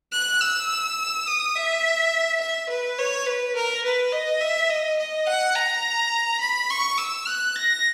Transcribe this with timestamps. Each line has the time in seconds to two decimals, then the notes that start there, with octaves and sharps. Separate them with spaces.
0.12 F#6
0.41 E6
1.27 D#6
1.55 E5
2.41 E5
2.69 B4
2.99 C#5
3.26 B4
3.55 A#4
3.84 B4
4.12 D#5
4.40 E5
4.69 D#5
4.99 D#5
5.26 F#5
5.55 A#5
6.41 B5
6.70 C#6
6.98 E6
7.27 F#6
7.56 A#6